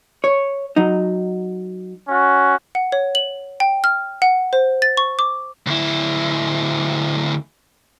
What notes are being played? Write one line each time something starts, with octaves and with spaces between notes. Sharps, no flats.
C#5
F#3 D#4
C#4 F#4
F#5
C#5
F#7
G5
F6
F#5
C5
A6
C#6
D6
D2 E4